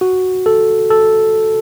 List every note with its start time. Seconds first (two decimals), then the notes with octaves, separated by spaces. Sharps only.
0.01 F#4
0.46 A4
0.90 A4